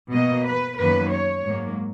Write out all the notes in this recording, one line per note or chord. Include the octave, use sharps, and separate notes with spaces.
B2 A#3 D#5
B4
F#2 D#3 F#3 A#3 B4
C#5
G#2 F#3 A#3